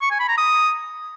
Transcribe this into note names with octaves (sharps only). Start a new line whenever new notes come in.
C#6
G#5
B5
A#5
D#6